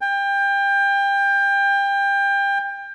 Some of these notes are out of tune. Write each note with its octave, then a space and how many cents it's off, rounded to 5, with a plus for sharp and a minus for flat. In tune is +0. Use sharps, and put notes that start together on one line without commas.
G5 +25